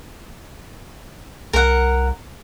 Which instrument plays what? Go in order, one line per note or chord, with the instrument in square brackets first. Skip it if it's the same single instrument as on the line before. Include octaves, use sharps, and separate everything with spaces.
[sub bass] C2 [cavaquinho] A#4 F#5